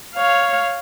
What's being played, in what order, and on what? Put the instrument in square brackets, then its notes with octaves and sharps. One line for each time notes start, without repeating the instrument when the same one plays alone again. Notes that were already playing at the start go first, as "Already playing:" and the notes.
[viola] C#5 F5